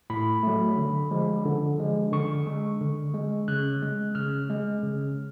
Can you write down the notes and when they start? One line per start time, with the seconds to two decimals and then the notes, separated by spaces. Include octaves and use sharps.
0.10 A2 B5
0.43 F#3 A3
0.77 D3
1.11 F3 G#3
1.46 D3
1.79 F3 G#3
2.12 D3 C#6
2.46 G#3
2.81 D3
3.14 G#3
3.48 C#3 F#6
3.82 G#3
4.15 C#3 F6
4.50 G#3
4.83 C#3